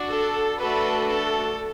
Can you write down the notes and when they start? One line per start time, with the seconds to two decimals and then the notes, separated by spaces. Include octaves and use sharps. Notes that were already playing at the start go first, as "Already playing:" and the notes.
Already playing: D4 F#4
0.09 A4
0.60 A3 D4 F#4 A4 B4
1.10 A4